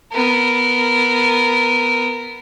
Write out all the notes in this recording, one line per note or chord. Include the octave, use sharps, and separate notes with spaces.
B3 A#4